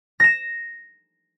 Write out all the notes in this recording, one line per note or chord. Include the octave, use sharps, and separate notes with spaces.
A#6 E7